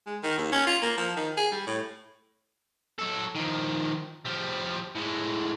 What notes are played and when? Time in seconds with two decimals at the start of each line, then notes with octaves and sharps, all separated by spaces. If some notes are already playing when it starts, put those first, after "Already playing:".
0.07 G#3
0.23 D#3
0.38 D#2
0.52 C#4
0.67 F4
0.82 A#3
0.97 F3
1.16 D#3
1.37 G#4
1.51 G3
1.67 A2
2.99 F#3 A4
3.35 D#3 F3
4.25 F3 G3
4.95 A2 G#3